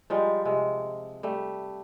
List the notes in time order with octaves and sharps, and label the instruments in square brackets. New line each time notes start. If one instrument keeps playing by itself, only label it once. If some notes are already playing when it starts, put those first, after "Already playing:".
[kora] F3 G3 G#3 F4
C3 G#3
G3 A3